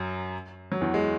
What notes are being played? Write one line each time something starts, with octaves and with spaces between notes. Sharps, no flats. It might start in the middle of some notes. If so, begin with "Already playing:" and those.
Already playing: F#2 F#3
F#3
E2 E3
G#3